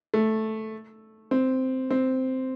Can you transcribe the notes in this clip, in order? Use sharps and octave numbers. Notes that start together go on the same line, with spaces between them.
A3
C4
C4